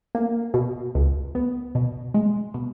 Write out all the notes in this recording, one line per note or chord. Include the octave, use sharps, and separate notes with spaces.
A#3
B2
C#2
B3
B2
G#3
B2